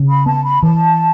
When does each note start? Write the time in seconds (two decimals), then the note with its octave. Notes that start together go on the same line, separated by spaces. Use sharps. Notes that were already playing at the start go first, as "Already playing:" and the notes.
Already playing: C#3
0.09 B5
0.26 B3 A5
0.45 B5
0.63 E3 A5